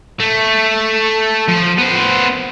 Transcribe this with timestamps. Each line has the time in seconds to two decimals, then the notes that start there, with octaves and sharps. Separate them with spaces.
0.20 A3
1.49 F3
1.78 B3 C5